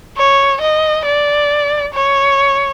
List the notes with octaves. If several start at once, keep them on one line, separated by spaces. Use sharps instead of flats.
C#5
D#5
D5
C#5